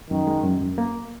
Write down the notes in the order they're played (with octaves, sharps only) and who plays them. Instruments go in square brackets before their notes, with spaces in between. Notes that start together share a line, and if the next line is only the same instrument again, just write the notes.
[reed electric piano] F#2 [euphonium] D#3
[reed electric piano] G#3
F#2
F#2
A#3